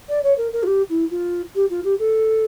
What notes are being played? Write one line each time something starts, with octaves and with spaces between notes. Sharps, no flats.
D5
C#5
A#4
A#4
F4
G4
E4
F4
G4
F4
G4
A4